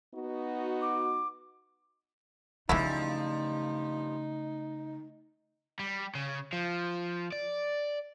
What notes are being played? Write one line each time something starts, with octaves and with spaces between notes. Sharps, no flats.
B3 D#4 F#4
D6
G2 C#3 E3 F3 G#3 A3 D#4 E4
G3
C#3
F3
D5